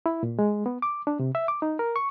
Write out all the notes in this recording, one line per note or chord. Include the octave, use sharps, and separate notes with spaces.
E4
A#2
G#3
B3
D6
D4
C3
E5
D6
D#4
A#4
C#6